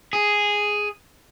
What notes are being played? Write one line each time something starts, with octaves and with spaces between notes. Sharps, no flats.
G#4